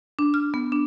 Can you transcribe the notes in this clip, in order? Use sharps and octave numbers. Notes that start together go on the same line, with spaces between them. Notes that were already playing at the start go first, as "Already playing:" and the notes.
D4
F6
B3
D4